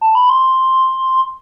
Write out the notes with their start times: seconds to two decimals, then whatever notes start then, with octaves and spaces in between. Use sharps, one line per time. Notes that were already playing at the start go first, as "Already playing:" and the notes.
0.01 A5
0.15 B5
0.29 C6